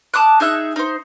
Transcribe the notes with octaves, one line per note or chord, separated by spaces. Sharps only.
A5 D6 D#6 F#6
D#4 G#4 E5 F#6
D#4 C5